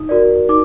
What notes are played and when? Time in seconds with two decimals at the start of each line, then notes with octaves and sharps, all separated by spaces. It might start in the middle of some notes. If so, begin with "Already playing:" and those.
Already playing: D#4 D#6
0.09 F#4 A#4 D5
0.49 D#4 D6